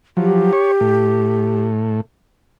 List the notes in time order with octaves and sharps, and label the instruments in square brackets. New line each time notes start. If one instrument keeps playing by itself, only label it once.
[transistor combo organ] F3 F#3 [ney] G4
[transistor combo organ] C#5
A2